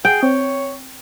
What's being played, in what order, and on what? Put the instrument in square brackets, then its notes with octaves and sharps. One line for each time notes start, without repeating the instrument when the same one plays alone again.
[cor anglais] G#4 [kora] G5
[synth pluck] C4 [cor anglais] C#5